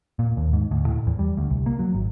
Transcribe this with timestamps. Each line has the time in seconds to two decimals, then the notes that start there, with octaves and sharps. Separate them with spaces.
0.19 A#2
0.37 D#2
0.53 G#2
0.71 D2
0.86 A2
1.07 E2
1.19 G3
1.37 D2
1.50 C2
1.66 A#3
1.79 F#3
1.94 G#1